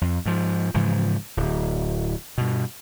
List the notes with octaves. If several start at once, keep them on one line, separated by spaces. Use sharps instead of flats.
F2
G#2 F3
G#2 C#3 E3 F3
D1
G2 B2